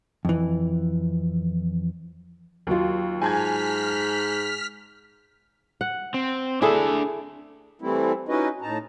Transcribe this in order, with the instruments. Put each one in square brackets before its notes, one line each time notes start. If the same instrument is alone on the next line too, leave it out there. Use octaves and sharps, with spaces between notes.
[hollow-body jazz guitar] F2 E3
[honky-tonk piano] D#2 [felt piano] F#3 F4
[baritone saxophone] G#2 [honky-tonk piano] G#5 A5 G#6 [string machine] F6 B6
[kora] F#5
[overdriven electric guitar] C4
[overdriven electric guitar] D4 E5 [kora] E4 G#4 A4
[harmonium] E3 G3 A3 C4 E4
C#4 D#4 E4 F#4 B4 D#5
A2 D#4 A5 A#5